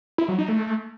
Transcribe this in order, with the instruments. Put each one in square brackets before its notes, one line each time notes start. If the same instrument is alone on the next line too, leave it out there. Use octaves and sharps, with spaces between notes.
[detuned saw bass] E4
F#3
D#4
A3